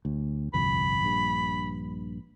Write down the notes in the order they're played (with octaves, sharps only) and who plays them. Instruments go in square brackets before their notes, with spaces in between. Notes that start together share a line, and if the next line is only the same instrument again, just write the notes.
[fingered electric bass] D2
[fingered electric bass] G1 C2 F2 [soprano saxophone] B5
[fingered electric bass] A#1 G2